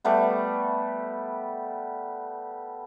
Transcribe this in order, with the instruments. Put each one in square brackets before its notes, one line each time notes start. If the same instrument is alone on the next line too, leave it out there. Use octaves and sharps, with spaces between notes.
[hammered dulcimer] G3 A3 B3